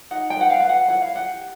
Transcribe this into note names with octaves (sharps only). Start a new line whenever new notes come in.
D#4 F#5
G5
B4 F#5
F5
B4 F5
F#5
E4 F#5
F5
G4 F#5